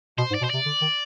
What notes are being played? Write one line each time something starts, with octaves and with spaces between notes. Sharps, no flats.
B2 C5
G#2
D5
B2 C5
C3 D5
D3
D#3